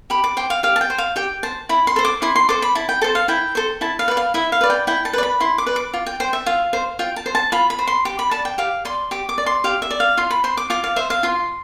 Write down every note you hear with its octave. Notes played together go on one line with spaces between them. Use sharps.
G4 B5
D6
C5 G5
F5
G4 F5
A5
G5
C5
F5
G4 G5
C5 A5
E4 B5
C6
A4 C5
D6
E4 C6
C6
A4 C5 D6
B5
E4 A5
G5
A4 C5 A5
F5
E4 G5
A4 C5
E4 A5
F5
B4 D5
F5
E4 E5
F5
B4 D5
G5
E4 G5
A5
B4 D5
B5
E4 C6
D6
B4 D5
D6
F4
G5
C5 G5
E5
F4 F5
C5
F4 G5
A5
C5
A5
F4 B5
B5
C5
C6
G4 D6
B5
D5 A5
G5
G4 F5
D5 C6
G4 D6
D6
D5
C6
G4 F5
E5
D5
F5
F4 C6
B5
C5 C6
D6
F4 D6
F5
C5 E5
F5
F4 C6